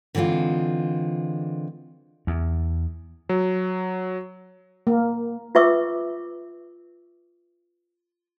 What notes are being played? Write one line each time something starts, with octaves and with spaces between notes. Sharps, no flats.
D3 E3 G#3 C4 F4
E2
F#3
A#3
F4 B4 E5 C#6 D6 E6